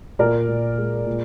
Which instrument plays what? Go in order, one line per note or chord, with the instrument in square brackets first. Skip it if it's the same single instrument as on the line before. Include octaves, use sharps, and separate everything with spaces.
[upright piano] A#2 A#4 D5
A#2
G#3
A#2